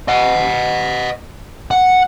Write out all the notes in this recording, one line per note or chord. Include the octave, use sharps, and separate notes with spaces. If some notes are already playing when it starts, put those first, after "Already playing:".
D#5 F#5
F#5